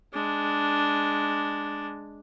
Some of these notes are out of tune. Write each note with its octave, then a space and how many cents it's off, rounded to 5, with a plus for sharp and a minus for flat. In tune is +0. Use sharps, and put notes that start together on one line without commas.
G#3 +0 D4 +0